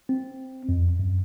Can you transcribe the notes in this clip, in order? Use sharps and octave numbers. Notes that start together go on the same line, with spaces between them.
C4
F2
F#2